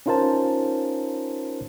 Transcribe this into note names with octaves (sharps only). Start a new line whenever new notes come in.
C#4 D#4 F4 A#4 C5 A5